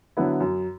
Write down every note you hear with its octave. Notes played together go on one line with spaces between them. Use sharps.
D3 F#3 B3 E4
F#2